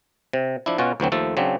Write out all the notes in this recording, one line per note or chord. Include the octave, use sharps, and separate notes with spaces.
C3
F3 D4 E4
B2 C#4 F4 F#4
D2 E3 F#3 C4
D#2 F3 A3 A4
C#3 F#3 C4 D4